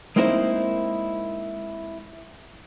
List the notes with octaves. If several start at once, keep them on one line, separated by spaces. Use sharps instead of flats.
G#3 A#3 C4 D#4 E4 C5